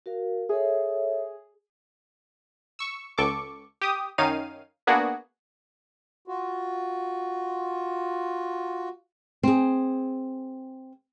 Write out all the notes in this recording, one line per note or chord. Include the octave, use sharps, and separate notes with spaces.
F#4 A#4 F5
G#4 A4 C#5 E5
C#6 E6
C#2 A4 C#6 D6
G4 D#6
F#2 D#3 C#4 D#4 F5 D#7
A#3 B3 D4 F#4 G#4
F4 F#4
C4 G#4